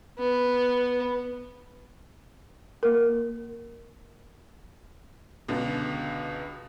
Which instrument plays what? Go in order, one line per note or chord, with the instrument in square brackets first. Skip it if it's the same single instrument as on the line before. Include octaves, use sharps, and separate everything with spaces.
[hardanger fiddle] B3
[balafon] A#3 A#4
[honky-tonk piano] C#2 B2 D3